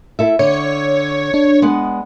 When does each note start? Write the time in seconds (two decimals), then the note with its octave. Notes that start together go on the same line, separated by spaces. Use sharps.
0.19 E4 A4 E5
0.39 D3 C#5
1.34 D4
1.62 G#3 B3 F#5